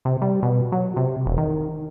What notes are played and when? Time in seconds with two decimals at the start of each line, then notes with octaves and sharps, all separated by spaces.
0.05 C3
0.21 G3
0.43 B2
0.72 F#3
0.96 C3
1.25 E1
1.38 D#3